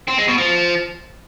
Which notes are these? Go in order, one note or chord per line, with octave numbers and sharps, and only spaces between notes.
C4
G#3
B2
F3